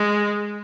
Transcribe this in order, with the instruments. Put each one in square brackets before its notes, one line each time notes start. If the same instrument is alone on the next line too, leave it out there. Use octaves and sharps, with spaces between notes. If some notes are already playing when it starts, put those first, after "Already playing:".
Already playing: [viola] G#3